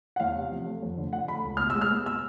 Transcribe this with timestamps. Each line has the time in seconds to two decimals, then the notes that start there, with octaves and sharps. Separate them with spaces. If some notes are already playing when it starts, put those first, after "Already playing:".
0.16 F#5
0.20 E2 F5
0.36 C3
0.52 F3
0.66 A3
0.83 F2
0.98 D3
1.13 F3 F#5
1.28 A3 B5
1.44 C#2
1.57 B2 F6
1.70 G#3 E6
1.81 F6
1.91 B3
2.06 E6